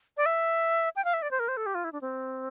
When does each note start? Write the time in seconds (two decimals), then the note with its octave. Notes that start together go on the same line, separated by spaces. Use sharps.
0.17 D5
0.26 E5
0.96 G5
1.04 F5
1.13 E5
1.22 D5
1.31 C5
1.39 A#4
1.48 C5
1.57 A4
1.66 G4
1.75 F4
1.84 E4
1.92 D4
2.01 C4